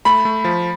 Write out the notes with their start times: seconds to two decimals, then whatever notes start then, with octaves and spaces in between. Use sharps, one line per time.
0.05 A3 B5
0.25 A3
0.44 F3